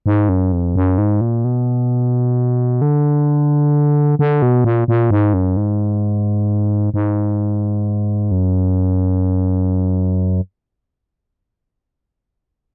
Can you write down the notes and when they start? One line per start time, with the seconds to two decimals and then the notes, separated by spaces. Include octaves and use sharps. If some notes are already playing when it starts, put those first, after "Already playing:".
0.06 G#2
0.29 F#2
0.52 F2
0.75 F#2
0.98 G#2
1.21 A#2
1.44 B2
2.81 D3
4.19 D3
4.42 B2
4.64 A#2
4.88 A#2
5.11 G#2
5.34 F#2
5.57 G#2
6.94 G#2
8.31 F#2